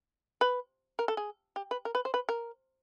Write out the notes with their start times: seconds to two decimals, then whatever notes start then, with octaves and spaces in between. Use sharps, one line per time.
0.41 B4
0.99 A#4
1.08 A4
1.17 G#4
1.56 G4
1.71 B4
1.85 A#4
1.95 B4
2.05 C5
2.14 B4
2.29 A#4